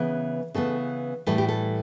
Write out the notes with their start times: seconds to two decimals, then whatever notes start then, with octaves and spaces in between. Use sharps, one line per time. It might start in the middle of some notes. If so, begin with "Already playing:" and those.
Already playing: C#3 E3 B3
0.54 C#3 E3 B3 A4
1.27 A2 E3 G3 A4
1.38 G4
1.48 A4